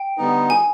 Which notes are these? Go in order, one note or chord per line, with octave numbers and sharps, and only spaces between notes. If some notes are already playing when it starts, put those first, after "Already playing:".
Already playing: G5
D3 G3 B3 D#4
G#5